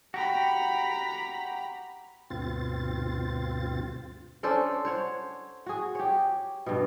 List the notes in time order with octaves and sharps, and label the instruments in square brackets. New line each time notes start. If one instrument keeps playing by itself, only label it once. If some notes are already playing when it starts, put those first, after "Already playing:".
[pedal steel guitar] F#4 G4 [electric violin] A#5 B5
[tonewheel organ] D2 G2 B2 C4 F4 A6
[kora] C#4 D4 A4 C5
C5 C#5 F#5
F#4 G#4
G4 C#5
G2 B2